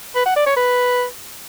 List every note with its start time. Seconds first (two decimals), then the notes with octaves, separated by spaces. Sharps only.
0.15 B4
0.26 F#5
0.36 D5
0.46 C#5
0.56 B4